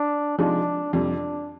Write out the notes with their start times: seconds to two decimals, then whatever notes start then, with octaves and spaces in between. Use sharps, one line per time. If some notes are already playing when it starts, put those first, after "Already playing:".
Already playing: D4
0.38 C3 F3 G#3 D4 D#4
0.93 F2 C3 G3 D4